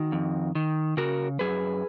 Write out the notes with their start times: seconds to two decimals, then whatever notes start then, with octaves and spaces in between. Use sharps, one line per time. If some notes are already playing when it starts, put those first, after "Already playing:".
Already playing: D#3 D#4 F#4
0.12 F2
0.55 D#3
0.97 C#3 F#4 A#4
1.39 F#2 G#4 B4